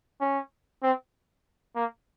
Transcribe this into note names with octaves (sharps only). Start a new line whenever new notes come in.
C#4
C4
A#3